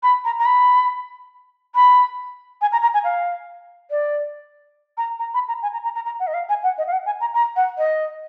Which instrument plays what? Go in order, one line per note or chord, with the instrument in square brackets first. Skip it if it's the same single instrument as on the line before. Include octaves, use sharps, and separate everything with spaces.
[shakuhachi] B5
A#5
A#5
B5
B5
G#5
A#5
A#5
G#5
F5
D5
A#5
A#5
B5
A#5
G#5
A#5
A#5
A#5
A#5
F#5
D#5
F5
G#5
F#5
D#5
F5
F#5
G#5
A#5
A#5
F#5
D#5